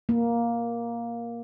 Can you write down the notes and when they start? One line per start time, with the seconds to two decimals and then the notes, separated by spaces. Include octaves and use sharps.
0.09 A#3